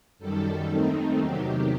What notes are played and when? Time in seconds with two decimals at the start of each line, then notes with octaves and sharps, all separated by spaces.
0.18 F#2 D#3 G3 A4
0.68 D#2 D#3 A3 C4 D#4
1.17 E2 C3 D#3 F#3 G4